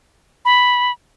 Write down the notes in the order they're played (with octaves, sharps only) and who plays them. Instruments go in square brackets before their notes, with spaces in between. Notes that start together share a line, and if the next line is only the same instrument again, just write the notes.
[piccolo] B5